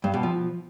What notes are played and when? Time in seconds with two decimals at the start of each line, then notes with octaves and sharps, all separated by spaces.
0.04 G2
0.14 B2
0.23 F3